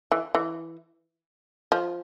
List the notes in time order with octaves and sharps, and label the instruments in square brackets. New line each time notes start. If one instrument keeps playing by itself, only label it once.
[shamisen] E3
E3
F3